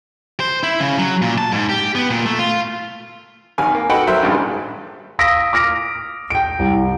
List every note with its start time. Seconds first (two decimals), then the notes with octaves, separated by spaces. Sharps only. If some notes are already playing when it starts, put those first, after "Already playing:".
0.40 C5
0.63 E4
0.80 C#3
0.98 F#3
1.22 A#2
1.38 A5
1.52 G#2
1.69 G4
1.95 B3
2.11 A#2
2.26 A3
2.39 F4
3.58 G#1 D#3 G#5 F6
3.75 A#3
3.90 F#4 A4 B4 D#5 F#5 G5
4.07 F#3 A#4 C5 E5
4.22 A1 G2 A#2 D#3 G3 G#3
5.19 F5 D#6 E6 A#6 B6 D7
5.53 D6 F6 A#6 D7
6.30 G5 D7
6.59 C2